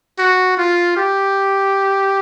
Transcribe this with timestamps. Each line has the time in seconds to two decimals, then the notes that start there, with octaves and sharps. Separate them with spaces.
0.19 F#4
0.57 F4
0.97 G4